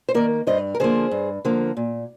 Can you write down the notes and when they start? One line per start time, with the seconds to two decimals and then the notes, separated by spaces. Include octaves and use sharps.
0.09 C5
0.14 D#3 A#3 A#4 D5
0.47 G2 C5 D#5
0.75 A#4
0.80 D3 F3 A#3 G#4 C5
1.11 G2
1.45 D3 F3 A#3
1.77 A#2